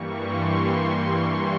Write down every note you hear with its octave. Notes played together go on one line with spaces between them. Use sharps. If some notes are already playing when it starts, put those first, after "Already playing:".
Already playing: G2 E3 G3 A#3 C#6
C6
C#6